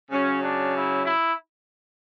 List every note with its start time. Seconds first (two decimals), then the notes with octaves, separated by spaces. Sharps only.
0.11 C#3 F#3 C#4
0.42 D4
0.74 E4
1.04 E4